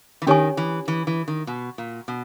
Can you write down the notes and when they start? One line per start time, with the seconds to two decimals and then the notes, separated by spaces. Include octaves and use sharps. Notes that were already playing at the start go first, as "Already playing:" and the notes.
0.22 E3
0.27 D#3 C#4 G4 C#5 G#5 C#6
0.57 E3
0.88 E3
1.07 E3
1.28 D#3
1.47 B2
1.78 A#2
2.08 B2